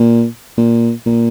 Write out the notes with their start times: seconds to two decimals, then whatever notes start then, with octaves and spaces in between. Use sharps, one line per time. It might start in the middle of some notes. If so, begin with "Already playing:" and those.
Already playing: A#2
0.58 A#2
1.06 A#2